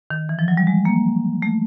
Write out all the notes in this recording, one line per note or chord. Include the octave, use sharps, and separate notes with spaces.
D#3
E3
F3
F#3
G3
G#3
A#3
A3